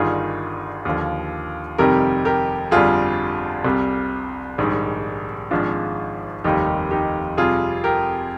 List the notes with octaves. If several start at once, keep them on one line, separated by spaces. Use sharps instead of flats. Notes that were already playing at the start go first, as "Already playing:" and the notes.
Already playing: G1 G2 D#3 G3 F4 G#4
D#2 D3 F3
F1 F2 C3 D#3 G3 G4 A#4
G4 A#4
G1 F2 D3 G3 F4 G#4
C2 C3 G3
A#1 G#2 D#3 G3
G#1 G#2 F3 D4 F4
F1 D#2 D#3 G3 D#4 G4
D#4 G4
F2 C3 G3 F4 G#4
G4 A#4